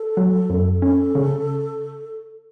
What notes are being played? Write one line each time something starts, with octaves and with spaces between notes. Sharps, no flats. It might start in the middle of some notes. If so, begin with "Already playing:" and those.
Already playing: A4
F#3
F#2
C#4 A4
C#3